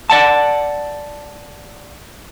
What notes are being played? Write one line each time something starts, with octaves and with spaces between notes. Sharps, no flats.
D5 F#5 A5